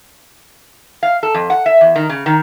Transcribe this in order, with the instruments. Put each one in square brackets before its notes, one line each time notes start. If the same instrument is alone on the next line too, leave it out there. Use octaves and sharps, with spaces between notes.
[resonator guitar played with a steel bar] F5
A4
F2
F#5
E5
E2
D#3
C#3
D#3